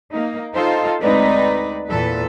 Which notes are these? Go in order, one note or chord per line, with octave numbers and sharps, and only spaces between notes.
A#3 D#4
D#4 F4 A4 C5
D2 G#3 C4 D#4 B4 D5
E2 A#2 E3 A4 B4